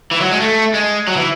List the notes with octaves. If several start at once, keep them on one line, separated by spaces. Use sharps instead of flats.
E3
F#3
G#3
A3
G#3
F#3
E3